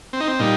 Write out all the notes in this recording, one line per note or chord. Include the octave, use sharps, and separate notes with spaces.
C4
D#4
C4
A#2 G3 D#4